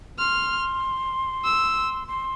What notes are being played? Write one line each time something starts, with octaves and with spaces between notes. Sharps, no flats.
C6 F6
E6
C6